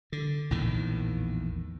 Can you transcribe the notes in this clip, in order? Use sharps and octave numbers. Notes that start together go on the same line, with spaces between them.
D3
A#1 E2 A2 D#3